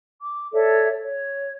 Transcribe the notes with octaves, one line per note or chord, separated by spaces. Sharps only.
D6
A4 C#5 D5 E5
C#5